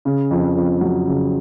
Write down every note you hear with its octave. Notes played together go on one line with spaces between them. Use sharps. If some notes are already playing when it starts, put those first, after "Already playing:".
C#3
F2
F2
F#3
C#3